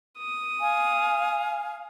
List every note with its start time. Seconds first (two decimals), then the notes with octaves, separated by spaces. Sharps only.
0.18 D#6
0.60 F5 G#5